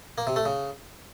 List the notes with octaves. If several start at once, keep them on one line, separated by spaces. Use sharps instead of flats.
A#3
C3
A3
C#3